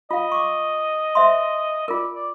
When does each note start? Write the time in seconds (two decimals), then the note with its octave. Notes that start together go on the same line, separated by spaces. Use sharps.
0.11 F4 D#5 F5
0.32 C#6 D6
1.15 C5 E5 C6
1.88 F4 A#4 D5
2.15 D5